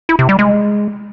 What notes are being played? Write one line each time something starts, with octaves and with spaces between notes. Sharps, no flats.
E4
C3
G3
G#3